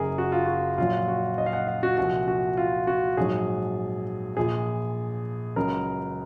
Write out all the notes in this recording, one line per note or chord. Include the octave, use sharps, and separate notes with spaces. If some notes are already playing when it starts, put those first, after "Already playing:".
Already playing: F#1 F#2 C#3 F#3 G#4 A#4
F#4
F4
F#4
A#1 A#2 F#3 F4
F#4
D#5
F5
F#5
F5
F#4
C2 A#2 F3 F#4
F#4
F4
F#4
A#1 G#2 F#3 G#4
A#1 A#2 F3 G#4
C#2 C#3 F#3 A#4